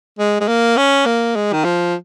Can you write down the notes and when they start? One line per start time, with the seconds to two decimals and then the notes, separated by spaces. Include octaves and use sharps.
0.19 G#3
0.40 G#3
0.48 A#3
0.77 C#4
1.06 A#3
1.36 G#3
1.53 D#3
1.64 F3